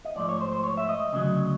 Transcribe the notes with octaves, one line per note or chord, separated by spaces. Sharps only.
D#5
G#2 F3 A3 D5
C#5
C5
C5
C#5
E5
D#5
D2 C#3 F#3